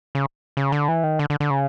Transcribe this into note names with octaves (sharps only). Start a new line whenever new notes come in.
C#3
C#3
D3
E3
D#3
D3
D3
D3
C#3